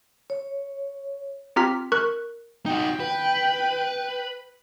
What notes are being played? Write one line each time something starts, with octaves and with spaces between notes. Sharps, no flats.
C#5
C4 F4 G4 A#5 F6 B6
A#4 C#6 F#6
D#4 F#4 G5
B4